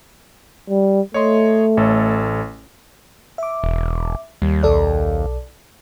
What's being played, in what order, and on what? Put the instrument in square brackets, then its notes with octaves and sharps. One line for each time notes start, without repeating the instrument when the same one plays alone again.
[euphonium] G3
[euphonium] A3 [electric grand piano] C#5 D#5 C6
[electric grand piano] A1 A4 C#5
[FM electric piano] E5 D6
[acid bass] E1
[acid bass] D#2 [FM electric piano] G3
[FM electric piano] B1 A4 D5